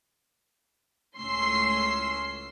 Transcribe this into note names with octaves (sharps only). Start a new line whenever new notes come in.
C#2 A2 C#4 C6 E6 C7